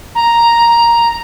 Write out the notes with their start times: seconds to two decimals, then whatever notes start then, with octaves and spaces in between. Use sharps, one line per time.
0.15 A#5